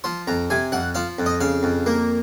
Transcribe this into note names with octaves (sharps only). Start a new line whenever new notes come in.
F3 C6
F2 A#5
C3 G#5
F2 F#5
F3 F5
F2
D#5
C#3 F5
F2
A#3